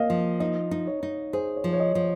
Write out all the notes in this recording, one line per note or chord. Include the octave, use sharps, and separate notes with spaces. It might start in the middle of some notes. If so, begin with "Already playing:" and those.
Already playing: A#3 D#5 F5
F3
D#4 D#5
D#4
C#5
D#4
G#4 C5
C#5
F3
C#5
D#5
F3